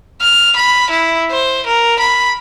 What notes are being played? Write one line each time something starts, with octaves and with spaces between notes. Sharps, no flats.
F6
B5
E4
C5
A#4
B5